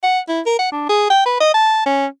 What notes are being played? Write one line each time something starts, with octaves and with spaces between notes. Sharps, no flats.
F#5
E4
A#4
F#5
D4
G#4
G5
B4
D#5
A5
C#4